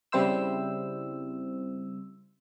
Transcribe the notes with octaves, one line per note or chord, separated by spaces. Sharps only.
C#3 G3 C4 E4 C5 E6